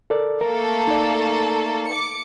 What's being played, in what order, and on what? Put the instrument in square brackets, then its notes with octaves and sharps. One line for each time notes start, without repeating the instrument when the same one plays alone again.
[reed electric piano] A4 A#4 D5
[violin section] A3 A#3 A4 [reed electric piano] A#4
[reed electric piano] D#4 D5
[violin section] D6 C#7